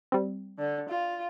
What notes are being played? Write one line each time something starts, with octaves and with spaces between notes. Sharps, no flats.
G3 C4
D3
F4